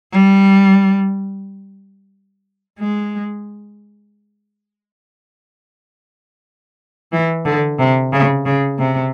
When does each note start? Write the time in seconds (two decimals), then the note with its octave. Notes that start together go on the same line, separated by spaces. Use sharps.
0.13 G3
2.79 G#3
7.12 E3
7.45 D3
7.79 C3
8.12 C#3
8.46 C#3
8.79 C3